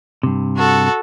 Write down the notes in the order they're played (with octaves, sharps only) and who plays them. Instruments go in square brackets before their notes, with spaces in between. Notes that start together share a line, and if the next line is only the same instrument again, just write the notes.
[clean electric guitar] G2 C3
[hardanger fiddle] F#4 A4